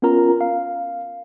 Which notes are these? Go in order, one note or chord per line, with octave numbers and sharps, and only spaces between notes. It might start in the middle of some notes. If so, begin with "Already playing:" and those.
B3 C#4 F4 A#4 A#5
F5